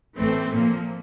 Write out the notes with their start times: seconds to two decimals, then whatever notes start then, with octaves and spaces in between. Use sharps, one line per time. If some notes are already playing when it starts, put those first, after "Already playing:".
0.17 A1 A2 E3 A3 C4
0.51 A#2 F3 A#3